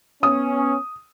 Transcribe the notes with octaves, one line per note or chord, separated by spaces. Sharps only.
B3 C#4 D#6